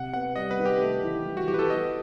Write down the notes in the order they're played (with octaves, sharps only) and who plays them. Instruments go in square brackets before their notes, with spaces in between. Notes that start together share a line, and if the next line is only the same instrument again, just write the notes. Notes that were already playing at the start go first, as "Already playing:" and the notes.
Already playing: [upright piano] C3 [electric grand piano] F#5
[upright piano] B3 [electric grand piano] F#5
[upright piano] G3 [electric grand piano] D#5
[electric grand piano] B4
[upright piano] D#3
[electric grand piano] G4
[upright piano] A3
E3
E3
[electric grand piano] F#4
[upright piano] E3 [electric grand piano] G4
[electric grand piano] B4
A4
[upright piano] B3 [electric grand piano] D#5